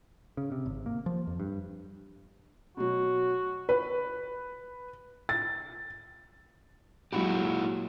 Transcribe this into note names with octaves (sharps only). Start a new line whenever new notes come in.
C#3
C3
G#1
A#3
F3
F2
G2
B2 F#3 F#4
B4
A6
A#2 F#3 G#3 E4 F#4 G4 B5